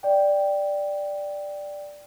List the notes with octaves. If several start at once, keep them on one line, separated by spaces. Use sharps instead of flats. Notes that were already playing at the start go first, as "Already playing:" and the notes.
D5 G5